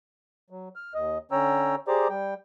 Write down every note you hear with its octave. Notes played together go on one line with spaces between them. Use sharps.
F#3
F6
D#2 D#5
D3 C#4 C#5 G5 A#5 E6
G4 G#4 C5 D5 A#5 D6
G3 G5